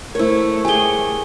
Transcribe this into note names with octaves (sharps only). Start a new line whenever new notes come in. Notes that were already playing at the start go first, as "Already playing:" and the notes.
A3 E4 A#4 C5 C#5
G4 G#4 G#5 G7